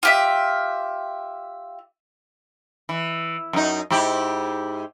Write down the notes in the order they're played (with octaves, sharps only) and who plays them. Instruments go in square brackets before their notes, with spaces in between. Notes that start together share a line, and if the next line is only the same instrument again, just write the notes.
[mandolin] F4 G4 E5
[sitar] E3
F#2 D#4
G#2 E4 G4